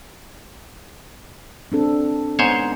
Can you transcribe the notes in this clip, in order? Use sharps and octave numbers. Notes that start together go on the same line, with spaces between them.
C4 D4 A4
G#2 B3 C5 C#5